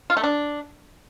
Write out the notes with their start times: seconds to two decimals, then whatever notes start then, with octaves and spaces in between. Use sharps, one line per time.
0.10 F4
0.17 A3
0.24 D4